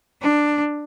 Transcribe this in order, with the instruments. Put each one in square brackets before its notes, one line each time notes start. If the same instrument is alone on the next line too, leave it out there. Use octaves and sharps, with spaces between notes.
[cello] D4